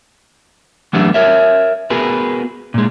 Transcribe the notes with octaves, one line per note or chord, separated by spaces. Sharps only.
E3 F#3 G3 A3 B3 D4
A#4 C#5 E5
B3 F#4 G#4 A#4 B4
A#2 G#3